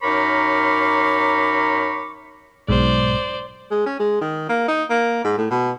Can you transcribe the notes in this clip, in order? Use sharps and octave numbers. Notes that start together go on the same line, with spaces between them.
F#2 D#4 A#4 C#5 B5 D6
B1 G#2 C5 D5
G#3
C#4
G#3
D#3
A#3
D#4
A#3
G#2
A2
B2